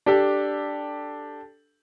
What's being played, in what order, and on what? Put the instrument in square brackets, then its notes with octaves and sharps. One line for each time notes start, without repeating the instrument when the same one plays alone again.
[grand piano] D4 G4 A4